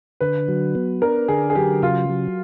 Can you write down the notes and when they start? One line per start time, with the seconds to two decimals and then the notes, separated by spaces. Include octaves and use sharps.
0.20 D3 B4
0.48 F#3
0.75 B3
1.02 D4 A#4
1.28 D3 G#4
1.50 G#4
1.55 F#3 G4
1.83 C#3 F4
2.09 F#3